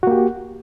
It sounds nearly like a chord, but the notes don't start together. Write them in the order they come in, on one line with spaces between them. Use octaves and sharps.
F#4 A#3 G4